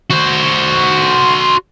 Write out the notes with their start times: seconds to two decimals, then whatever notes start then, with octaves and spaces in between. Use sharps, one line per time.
0.10 F#4 C5